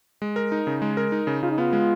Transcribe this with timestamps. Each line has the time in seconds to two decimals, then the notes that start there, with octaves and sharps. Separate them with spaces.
0.22 G#3
0.36 A#4
0.52 D#4
0.67 C#3
0.82 G#3
0.97 A#4
1.12 D#4
1.27 C#3
1.43 C#3 F4
1.51 D#4
1.58 B3 F4
1.73 G#3